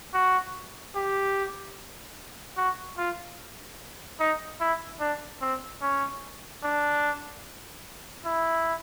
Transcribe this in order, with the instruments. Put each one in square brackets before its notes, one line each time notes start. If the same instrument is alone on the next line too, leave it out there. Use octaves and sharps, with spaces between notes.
[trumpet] F#4
G4
F#4
F4
D#4
E4
D4
C4
C#4
D4
E4